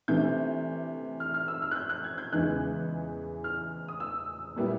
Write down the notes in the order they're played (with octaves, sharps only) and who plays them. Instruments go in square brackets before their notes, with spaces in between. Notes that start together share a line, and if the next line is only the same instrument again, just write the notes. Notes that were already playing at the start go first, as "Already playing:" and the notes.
[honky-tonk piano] C3 E3 A3 D4 G6
F6
F6
E6
F6
F#6
G6
F#6
G#6
G6
E2 C#3 E3 G#3 F#6
F6
D#6
E6
A#2 G3 B3 E4